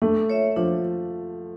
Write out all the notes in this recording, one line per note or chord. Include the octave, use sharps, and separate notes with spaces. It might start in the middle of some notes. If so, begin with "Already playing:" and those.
A3 D4
F4 C#5 E5
F3 D4